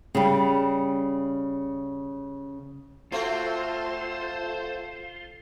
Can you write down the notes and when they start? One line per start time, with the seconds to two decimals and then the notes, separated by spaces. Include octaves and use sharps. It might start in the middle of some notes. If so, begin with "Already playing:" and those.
0.15 C#3 G3
3.12 A3 C4 F4 F#4 A4 C5